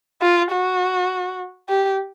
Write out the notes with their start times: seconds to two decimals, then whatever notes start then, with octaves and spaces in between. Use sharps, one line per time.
0.22 F4
0.52 F#4
1.69 G4